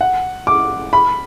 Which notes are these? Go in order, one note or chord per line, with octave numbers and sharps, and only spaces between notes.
F#5
D6
B5